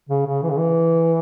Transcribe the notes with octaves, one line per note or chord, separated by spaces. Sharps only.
C#3
C#3
E3
C#3
E3